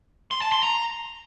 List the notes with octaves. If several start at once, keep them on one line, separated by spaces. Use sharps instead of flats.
C6
A5
C6
A#5